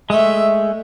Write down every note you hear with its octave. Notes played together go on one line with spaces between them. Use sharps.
G#3 A3 E5